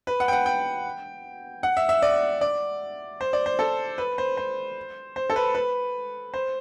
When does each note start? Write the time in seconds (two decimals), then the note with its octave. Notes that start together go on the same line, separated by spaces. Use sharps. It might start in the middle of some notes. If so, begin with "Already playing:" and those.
0.07 B4
0.20 F#5
0.28 G5
0.33 F#5
0.46 G5
1.63 F#5
1.77 E5
1.89 E5
2.02 D5
2.41 D5
3.21 C5
3.33 D5
3.46 C5
3.59 A4
3.98 B4
4.18 C5
4.37 C5
5.16 C5
5.30 A4
5.36 B4
5.55 B4
6.34 C5